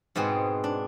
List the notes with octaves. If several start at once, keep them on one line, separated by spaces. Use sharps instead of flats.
G#2 B2 B3 C4 G#4
D4